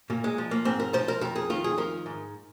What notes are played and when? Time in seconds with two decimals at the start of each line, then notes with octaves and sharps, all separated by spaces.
0.10 A#2 A#3
0.24 G#3
0.38 F3
0.51 A#3
0.65 G#2 C4
0.80 A#4
0.93 F3 C5
1.08 A#4
1.21 F2 A#4
1.36 G#4
1.50 D#3 F4
1.64 G#4
1.78 F3 A#4
2.06 G#2